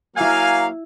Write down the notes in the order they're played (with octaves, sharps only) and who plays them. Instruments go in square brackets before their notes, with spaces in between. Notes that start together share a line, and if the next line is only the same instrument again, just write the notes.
[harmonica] F#3 A#3 [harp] E4 E6 [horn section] F5 [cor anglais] G#5